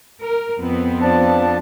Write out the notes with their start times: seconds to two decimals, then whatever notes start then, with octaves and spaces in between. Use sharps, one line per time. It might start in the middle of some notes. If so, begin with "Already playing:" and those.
0.21 A#4
0.60 F2 B3 C4
1.01 F3 D4 A5